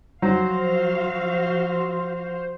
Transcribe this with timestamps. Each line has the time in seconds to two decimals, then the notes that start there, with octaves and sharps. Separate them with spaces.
0.22 F3 F#3 F#4 C5 F5